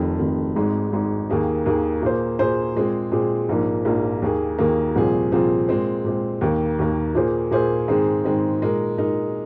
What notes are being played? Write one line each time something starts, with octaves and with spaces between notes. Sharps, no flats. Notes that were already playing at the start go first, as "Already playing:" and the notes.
Already playing: F1 F2 D#3
F1 F2 D#3
G#1 G#2 G#3
G#1 G#2 G#3
D#2 D#3 A#3 G#4
D#2 D#3 A#3 G#4
A#2 A#3 G#4 C5
A#2 A#3 G#4 C5
A#2 G#3 C4 G#4
A#2 G#3 C4 G#4
A#1 G#2 F3 A#3
A#1 G#2 F3 A#3
D#2 D#3 A#3 G#4
D#2 D#3 A#3 G#4
C2 A#2 F3 C4 G#4
C2 A#2 F3 C4 G#4
A#2 G#3 C4
A#2 G#3 C4
D#2 D#3 A#3
D#2 D#3 A#3
A#2 A#3 G#4 C5
A#2 A#3 G#4 C5
G#2 D#3 G#3 C4 G#4
G#2 D#3 G#3 C4 G#4
A#2 G#3 D#4 A#4
A#2 G#3 D#4 A#4